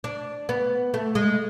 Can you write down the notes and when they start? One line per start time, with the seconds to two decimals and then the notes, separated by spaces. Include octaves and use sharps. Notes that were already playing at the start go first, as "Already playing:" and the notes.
0.04 D4
0.49 B3
0.94 A3
1.15 G#3